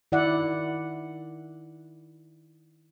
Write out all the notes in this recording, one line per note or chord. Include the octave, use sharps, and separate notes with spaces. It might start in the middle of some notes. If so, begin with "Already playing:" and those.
D#3 E4 D5 E5 F#5